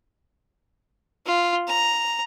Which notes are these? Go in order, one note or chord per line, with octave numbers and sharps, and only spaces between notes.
F4
A#5